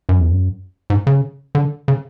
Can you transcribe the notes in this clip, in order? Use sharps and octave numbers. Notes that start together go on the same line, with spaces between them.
F#2
E2
F#2
G#2
C#3
D3
C#3